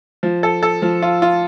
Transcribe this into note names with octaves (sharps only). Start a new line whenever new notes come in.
F3
A4
A4
F3
F4
F4